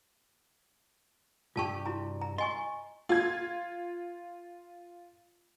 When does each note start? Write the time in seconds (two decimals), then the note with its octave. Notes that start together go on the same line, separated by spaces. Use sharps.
1.56 C2 G2 F4 G4 A5 C#6
1.86 E4 F#4 A#5
2.21 A#5
2.38 D#5 G#5 C6 C#6
3.09 F4 G#6